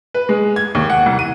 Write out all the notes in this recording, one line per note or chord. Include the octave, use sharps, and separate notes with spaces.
B4
G#3
G#6
D#2
F#5
C2
D#7